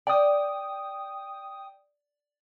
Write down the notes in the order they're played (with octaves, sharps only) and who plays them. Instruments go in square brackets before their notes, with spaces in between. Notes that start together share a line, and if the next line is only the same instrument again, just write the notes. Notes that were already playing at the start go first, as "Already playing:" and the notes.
[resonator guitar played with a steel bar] D5 [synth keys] G5 D#6